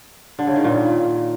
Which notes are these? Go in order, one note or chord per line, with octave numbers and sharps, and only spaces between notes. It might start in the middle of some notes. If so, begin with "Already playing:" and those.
D3
C#3
D#3
A#2